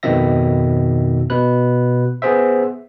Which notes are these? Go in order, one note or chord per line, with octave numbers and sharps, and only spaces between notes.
F2 G#2 B2 D#3 E5 A#6
B2 B4 F#6
B3 G#4 C5 E5